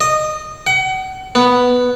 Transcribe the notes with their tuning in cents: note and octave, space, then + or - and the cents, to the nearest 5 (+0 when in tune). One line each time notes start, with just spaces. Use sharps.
D#5 -15
F#5 +35
B3 +0